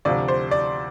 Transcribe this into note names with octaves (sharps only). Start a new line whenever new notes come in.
D2 C3 F3 D5
C5
D5